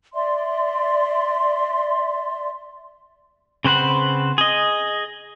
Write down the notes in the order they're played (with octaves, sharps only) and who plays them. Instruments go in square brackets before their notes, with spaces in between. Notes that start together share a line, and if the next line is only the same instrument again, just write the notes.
[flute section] D5 E5 C6
[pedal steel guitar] C#3 C4 B4 C5 F#5
G#4 D#5